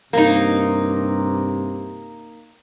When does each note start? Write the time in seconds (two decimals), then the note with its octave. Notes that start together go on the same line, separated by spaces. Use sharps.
0.13 G2 C3 A#3 D#4